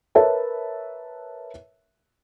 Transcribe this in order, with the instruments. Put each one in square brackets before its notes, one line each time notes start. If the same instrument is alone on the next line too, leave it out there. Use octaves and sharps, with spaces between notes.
[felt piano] A#4 B4 C#5 E5 A5